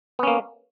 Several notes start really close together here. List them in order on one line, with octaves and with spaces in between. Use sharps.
B3 C#4 A#3